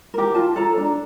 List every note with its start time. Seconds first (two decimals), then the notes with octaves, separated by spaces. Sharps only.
0.14 G4 A#4
0.35 F4 A5
0.56 A4 A#5
0.77 D4 A#5